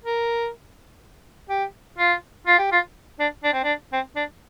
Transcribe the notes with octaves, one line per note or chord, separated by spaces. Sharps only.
A#4
G4
F4
F4
G4
F4
D4
D4
C4
D4
C4
D4